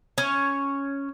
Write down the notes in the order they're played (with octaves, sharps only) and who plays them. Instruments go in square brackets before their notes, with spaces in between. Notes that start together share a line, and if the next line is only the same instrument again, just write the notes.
[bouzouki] C#4 C#5